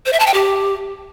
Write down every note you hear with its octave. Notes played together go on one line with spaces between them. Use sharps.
C5
E5
A5
G5
G4